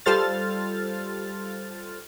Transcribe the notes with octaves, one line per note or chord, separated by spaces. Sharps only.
G3 F4 A4 C5 F6 A6